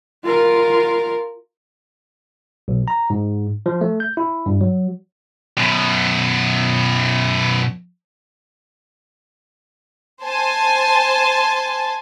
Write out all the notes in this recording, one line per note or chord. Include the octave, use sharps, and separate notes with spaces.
F4 A#4
B1
A#5
G#2
F3
A3
G6
E4
G2
F#3
F#2 B2
C5 G#5 A5